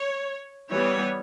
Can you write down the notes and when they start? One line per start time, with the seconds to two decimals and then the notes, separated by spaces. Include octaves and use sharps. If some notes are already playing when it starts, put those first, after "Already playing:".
Already playing: C#5
0.71 E3 G3 B3 C#5